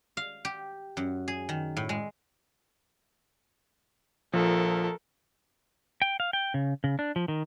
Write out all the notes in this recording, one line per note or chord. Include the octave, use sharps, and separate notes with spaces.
F5
G4
F#2
G#4
D#3
A2
G#3
A#1 F3 A4 A#4
G5
F5
G5
C#3
C#3
D4
F3
D#3